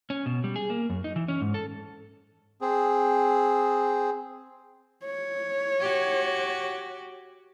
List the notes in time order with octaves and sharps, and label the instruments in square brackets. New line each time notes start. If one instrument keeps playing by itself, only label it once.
[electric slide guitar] C#4
B2
G3
G#4
A#3
F#2
D#4
E3
C#4
G#2
A4
[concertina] C4 G#4
[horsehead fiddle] C#5
[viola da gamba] F#4 G4